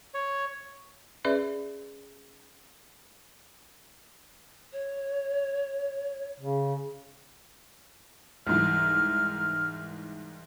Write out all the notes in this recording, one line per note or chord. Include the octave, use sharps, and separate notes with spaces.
C#5
C#4 G#4 B4 D5 E5
C#5
C#3
C2 G#2 E3 F6